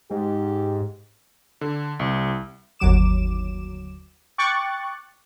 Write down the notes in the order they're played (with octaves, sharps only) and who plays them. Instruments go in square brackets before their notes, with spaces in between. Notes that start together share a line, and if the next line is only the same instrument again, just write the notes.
[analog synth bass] G#2 [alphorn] G4
[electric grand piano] D3
C2
[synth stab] G1 D#2 F#3 D6 E7
G5 C#6 D6 F#6 A6